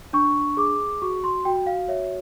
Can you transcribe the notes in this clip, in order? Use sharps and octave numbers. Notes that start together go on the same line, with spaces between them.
D4 C#6
G#4 D6
F#4 C#6
C6
F#4 G5
F5
C#5 E5